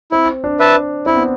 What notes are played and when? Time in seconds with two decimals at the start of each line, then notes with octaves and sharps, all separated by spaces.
0.12 C4 E4
0.44 D4
0.60 B4 E5 A5
1.06 C4 E4
1.16 B3